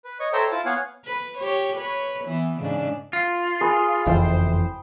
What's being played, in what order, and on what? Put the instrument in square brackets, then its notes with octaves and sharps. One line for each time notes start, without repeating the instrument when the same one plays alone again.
[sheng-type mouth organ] B4
C#5 D#5 C#6
A4 C5 C#5 E5 G5 A#5
E4 F4 A5
B3 C#5 F5 F#5 G#5
[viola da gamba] B4
G4 C#5
B4 C#5
E3 B3
G#2 C#3 D4
[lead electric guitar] F4 [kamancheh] C6
[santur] G#4 B4
[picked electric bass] F#1 F2 E3 [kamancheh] C5 [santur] G5